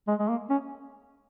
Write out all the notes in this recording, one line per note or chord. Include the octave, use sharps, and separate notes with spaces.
G#3
G#3
A#3
C#4